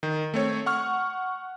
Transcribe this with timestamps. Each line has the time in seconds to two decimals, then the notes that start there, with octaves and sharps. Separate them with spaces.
0.03 D#3
0.34 A3 C4 C#5
0.66 F#5 C#6 F6